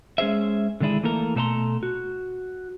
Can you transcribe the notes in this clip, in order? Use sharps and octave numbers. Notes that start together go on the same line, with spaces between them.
G#3 C#4 G#4 C5 E5
D3 D#3 G#3 D4 E4 G#4
E3 A3 A#3 A4 A#4
B2 A3 A4 D5 A#5 C6
F#4